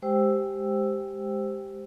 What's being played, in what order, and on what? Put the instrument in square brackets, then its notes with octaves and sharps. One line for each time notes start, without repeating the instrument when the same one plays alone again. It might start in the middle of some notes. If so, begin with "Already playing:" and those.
[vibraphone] G#3 G4 C5 G5 E6